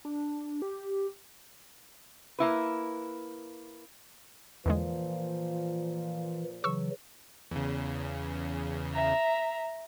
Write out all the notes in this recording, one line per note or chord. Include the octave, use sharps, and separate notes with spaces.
D4
G4
A#3 E4 B4
E2 A#2 D3 E3 F3 G#3
C#3 E3 F#3 C#6 E6
E2 C#3
E5 A#5